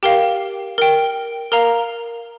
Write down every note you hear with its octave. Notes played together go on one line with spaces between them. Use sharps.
G4 A#4 F5 G5
A#4 G5
A#4 F5 A#5